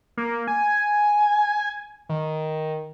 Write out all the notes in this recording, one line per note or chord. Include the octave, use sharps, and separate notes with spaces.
A#3
G#5
D#3